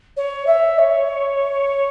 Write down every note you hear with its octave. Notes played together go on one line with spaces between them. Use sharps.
C#5
E5
C#5